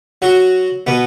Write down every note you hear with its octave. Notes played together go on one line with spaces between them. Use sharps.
F#3 F#4
B2 B3